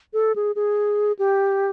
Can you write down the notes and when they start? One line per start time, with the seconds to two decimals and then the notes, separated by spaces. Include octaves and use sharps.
0.13 A4
0.36 G#4
0.56 G#4
1.19 G4